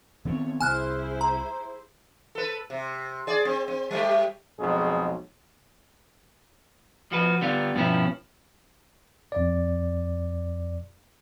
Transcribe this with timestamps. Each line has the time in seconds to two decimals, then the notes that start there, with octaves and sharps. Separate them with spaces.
0.25 D#3 B3 C4 A4 C#5
0.61 C2 E4 G#4 C5 G#5 F6 F#6
1.21 A#5
2.35 A4 B4
2.70 C3
3.27 G#4 D5
3.45 C4
3.68 C4
3.91 G3 A3 G4
4.59 B1 F2 B2 G#3 G#4
7.12 F3 F#4 B4
7.41 D3 G3 B3 F4
7.75 G2 B2 F3 B3 C#4 E4
9.32 F2 D5